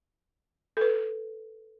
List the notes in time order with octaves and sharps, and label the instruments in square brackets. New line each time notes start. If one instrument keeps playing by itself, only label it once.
[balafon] A4 B4